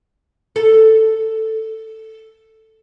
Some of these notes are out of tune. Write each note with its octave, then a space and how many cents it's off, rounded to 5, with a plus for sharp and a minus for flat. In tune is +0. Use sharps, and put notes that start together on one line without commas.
A4 +5